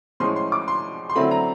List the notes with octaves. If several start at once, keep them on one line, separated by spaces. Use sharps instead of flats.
A2 F3 G#3 C#4 C6
C6
D6
C6
C6
D3 F#3 A3 C4 E4 B5
A#5